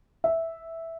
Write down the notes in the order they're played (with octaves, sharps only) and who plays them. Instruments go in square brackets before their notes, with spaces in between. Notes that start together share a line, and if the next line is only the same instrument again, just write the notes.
[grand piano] E5